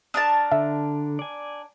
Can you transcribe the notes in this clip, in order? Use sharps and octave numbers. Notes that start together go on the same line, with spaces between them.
D4 A#4 A5 D#6
D3 E5
D5 G#5